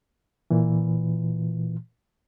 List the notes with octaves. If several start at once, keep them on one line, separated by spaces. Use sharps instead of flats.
A#2 E3